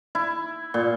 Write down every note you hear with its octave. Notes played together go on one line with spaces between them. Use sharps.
E4
A#2